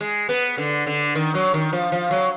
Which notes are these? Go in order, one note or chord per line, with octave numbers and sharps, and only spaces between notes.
G#3
B3
D3
D3
D#3
F#3
D#3
F3
F3
F#3